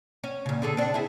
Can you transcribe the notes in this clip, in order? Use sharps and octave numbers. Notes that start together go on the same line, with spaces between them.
C#4
A#2 C#3
D3 G#4 A4
C4 D4
E4 G#4